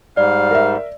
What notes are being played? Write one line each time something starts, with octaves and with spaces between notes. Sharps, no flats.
G#2 G3 D5 F5
A#4 E5